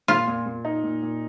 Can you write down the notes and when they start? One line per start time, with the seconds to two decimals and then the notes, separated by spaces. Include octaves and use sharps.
0.08 A#2 F4
0.28 A#2
0.46 A#2
0.65 D#4
0.83 A#2
1.02 A#2